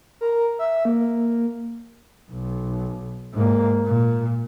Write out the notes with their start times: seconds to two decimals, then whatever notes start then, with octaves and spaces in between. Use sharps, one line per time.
0.21 A#4
0.59 E5
0.85 A#3
2.32 B1
3.34 G#2 A#3
3.86 A#2